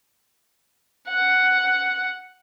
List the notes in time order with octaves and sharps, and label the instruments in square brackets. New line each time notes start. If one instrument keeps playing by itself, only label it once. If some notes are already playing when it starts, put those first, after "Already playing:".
[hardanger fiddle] F#5